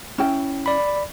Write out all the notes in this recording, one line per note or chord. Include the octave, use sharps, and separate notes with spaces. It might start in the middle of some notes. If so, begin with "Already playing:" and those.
C#4 E4 G5
D5 B5